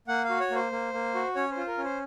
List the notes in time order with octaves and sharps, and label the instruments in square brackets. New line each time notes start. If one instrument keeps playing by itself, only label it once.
[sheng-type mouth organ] A#3 F#5
F#4 F5
C#5
A#3
C5
A#3
A#3
F#4
C#4 C#5
C5
F4
A#4
C#4
C5